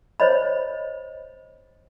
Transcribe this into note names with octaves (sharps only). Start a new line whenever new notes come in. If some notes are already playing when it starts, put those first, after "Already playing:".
C5 C#5 D#5 B5